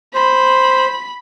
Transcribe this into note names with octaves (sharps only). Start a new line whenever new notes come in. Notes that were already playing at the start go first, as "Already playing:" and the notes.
C5 B5